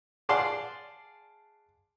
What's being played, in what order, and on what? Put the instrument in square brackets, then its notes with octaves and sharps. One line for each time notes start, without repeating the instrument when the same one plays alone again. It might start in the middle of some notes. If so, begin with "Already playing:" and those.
[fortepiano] G#4 D5 F5 F#5 A5 C6